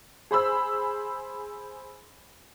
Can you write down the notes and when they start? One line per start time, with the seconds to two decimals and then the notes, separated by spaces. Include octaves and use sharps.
0.31 G#4 C5 B5 E6